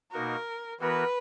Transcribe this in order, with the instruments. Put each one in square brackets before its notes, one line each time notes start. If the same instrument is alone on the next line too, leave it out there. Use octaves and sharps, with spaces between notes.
[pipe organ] B2 A#3 D#4 F#4 [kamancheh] A#4
[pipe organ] E3 B3 F#4 A#4 [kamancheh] B4